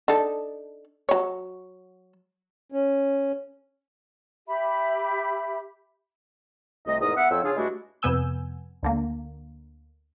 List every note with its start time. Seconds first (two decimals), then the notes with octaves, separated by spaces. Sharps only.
0.08 D4 D#4 A4
1.09 F#3 C#5
2.72 C#4
4.47 G4 E5 B5
6.86 C2 C3 A3 D#5
6.99 E2 G#2 A#4 A#5 D#6
7.15 B3 E5 F#5
7.29 F2 F3 C#5 G5 E6
7.43 C#3 C#4 D4 F4 G#4
7.56 G2 G#3 A3 D4 E4 F#4
8.02 F2 C3 B3 G#5 E6 G6
8.83 D2 D3 A#3